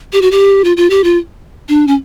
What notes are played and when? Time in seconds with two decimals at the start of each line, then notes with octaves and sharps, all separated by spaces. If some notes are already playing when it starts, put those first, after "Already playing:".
0.13 G4
0.22 F#4
0.31 G4
0.64 F4
0.77 F4
0.90 G4
1.04 F4
1.69 D4
1.87 C#4